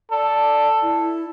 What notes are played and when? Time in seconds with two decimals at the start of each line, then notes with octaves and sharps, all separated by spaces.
0.12 A4 D5
0.82 E4